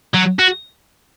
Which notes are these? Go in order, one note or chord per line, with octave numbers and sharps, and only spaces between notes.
F#3
F#4